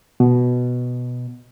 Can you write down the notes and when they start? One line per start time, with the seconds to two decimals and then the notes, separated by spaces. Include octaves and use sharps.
0.20 B2